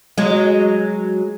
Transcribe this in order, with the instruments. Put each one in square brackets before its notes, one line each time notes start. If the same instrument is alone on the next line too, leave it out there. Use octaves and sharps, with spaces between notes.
[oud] F#3 G#3